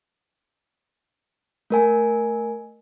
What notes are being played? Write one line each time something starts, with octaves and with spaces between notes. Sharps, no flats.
A3 A#4 G#5